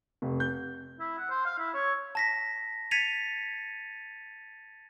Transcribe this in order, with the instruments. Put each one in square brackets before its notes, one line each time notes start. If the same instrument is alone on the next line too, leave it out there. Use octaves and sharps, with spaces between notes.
[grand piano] F1
G6
[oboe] E4
F#5
C5
F5
E4
C#5
[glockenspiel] A5 A#6 B6
G#6 A6 B6 C#7 D#7 F7